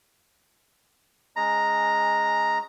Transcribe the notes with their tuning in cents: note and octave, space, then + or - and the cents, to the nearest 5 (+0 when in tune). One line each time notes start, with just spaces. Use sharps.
G#3 +0 C#4 +0 A#5 +0